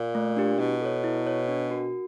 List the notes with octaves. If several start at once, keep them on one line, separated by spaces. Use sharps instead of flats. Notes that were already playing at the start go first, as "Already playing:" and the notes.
Already playing: A#2
A3
D4 G4
B2 E4
A4 C#5
E4
A4 C#5
D4
F#4 A#4